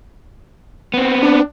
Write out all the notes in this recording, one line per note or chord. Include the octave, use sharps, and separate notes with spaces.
B3 C4
D4